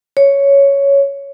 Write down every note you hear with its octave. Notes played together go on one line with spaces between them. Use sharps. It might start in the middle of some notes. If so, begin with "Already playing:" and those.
C#5